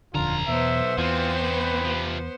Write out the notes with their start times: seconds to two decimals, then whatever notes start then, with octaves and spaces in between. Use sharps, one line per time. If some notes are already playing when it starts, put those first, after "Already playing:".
0.14 D#1 B1 F2 D3 F4 A#5
0.48 E2 B2 B3 C5 E5
0.98 E2 E3 C4 F4
1.52 B4
1.84 C3 F3